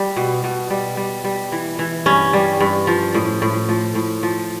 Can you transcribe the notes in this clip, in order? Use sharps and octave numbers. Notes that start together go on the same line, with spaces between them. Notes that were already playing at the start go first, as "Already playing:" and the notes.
Already playing: G3
B2
B2
G3
G3
G3
E3
E3
G2 C#4
G3
G2
F3
A2
A2
F3
A2
F3